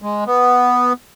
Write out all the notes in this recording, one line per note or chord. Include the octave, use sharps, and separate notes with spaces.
G#3
B3